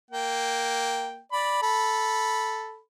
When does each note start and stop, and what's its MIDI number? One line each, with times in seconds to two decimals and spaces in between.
0.11 1.20 58
0.11 1.20 79
1.32 1.59 74
1.32 1.59 83
1.62 2.79 69
1.62 2.79 83